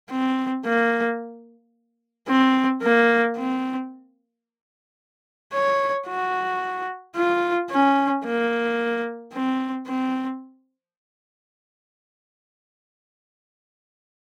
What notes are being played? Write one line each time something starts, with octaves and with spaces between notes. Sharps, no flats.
C4
A#3
C4
A#3
C4
C#5
F#4
F4
C#4
A#3
C4
C4